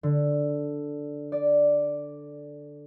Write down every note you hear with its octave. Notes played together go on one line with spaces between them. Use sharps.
D3
D5